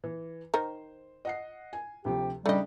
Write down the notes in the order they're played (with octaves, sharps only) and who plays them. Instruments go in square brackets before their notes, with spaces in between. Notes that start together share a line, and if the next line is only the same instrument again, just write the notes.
[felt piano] E3
[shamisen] D#3 D#4 A#4 [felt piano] C5
[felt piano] D#5 F#5 C7
G#5
[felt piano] D2 C3 F3 [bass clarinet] G4
[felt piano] C#3 D4 D#4 [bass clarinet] G3 [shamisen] A3 D#5